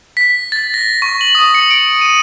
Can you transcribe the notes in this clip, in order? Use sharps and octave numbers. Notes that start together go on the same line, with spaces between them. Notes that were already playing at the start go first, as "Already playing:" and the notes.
B6
A6
A#6
C#6
F#7
D#6
C#7
D7
D#7